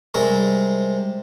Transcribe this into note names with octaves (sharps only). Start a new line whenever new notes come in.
C3 G3 G#3 C4 A#4